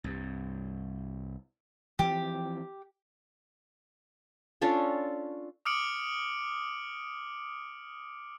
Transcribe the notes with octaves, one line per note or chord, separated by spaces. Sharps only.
C2 G2
E3 F3 C4 G4
C#4 D4 F4 A4
D6 D#6 F6 C#7 D7 F#7